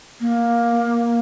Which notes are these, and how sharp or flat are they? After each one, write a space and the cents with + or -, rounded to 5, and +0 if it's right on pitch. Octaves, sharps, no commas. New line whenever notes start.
A#3 +10